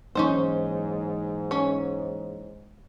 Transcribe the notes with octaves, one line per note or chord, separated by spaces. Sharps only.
G#2 E3 F#3 A#3 C#4 D#4 C5
C#4 C#5